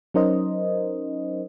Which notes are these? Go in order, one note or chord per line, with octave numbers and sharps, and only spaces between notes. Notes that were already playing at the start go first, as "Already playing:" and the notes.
F#3 C#4 D#4 A#4 C5 D#5